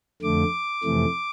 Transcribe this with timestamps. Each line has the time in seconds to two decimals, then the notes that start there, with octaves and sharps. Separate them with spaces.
0.22 F2 D3 A3 D6
0.84 F2 C3 E3 A3